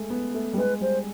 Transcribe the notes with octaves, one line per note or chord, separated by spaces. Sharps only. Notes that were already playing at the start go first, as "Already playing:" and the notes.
Already playing: G#3 A3
B3
A3
G3
G#3 B4
G3 C5